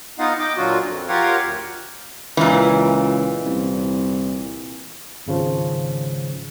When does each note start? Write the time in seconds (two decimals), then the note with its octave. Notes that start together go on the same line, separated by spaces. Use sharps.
0.19 B3 D#4 F4 D#5 F5 F#5
0.39 D#5 G5 D6
0.57 A#2 D3 F#3 F4 F#4
0.85 F2
1.08 F4 G4 A#4 C#5 F5 F#5
1.42 D2
2.37 C#2 A#2 E3
3.46 C2
5.27 G#1 C#3 F3